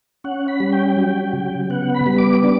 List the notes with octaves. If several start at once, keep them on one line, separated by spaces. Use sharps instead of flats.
C#4 F#5
B5
G3
G5
F#3
C#3
B3 F#5
B5
G3
D6
D4 D6